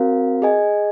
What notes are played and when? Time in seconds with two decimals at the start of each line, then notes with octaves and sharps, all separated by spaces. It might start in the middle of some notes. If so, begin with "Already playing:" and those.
Already playing: C4 F#4 A#4 F5
0.42 G#4 D#5 G#5